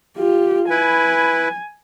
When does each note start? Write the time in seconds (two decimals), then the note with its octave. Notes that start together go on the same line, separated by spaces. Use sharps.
0.17 F4 G4
0.70 E4 B4 G#5